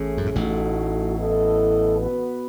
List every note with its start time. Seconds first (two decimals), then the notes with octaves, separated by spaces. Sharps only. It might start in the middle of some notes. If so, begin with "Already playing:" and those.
Already playing: A1 A2 A3 C#4 G#4
0.17 F#2
0.26 G#2
0.35 A1 A2 A3 D#4 F#4
1.17 B3 E4 A4 D#5
1.98 B3 F#4 B4